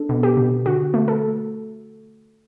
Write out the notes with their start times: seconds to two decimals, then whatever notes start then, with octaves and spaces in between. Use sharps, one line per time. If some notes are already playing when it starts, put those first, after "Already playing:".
Already playing: D4 A4
0.09 B2
0.23 G4
0.37 B2
0.66 D3 F#4
0.94 A3
1.08 A4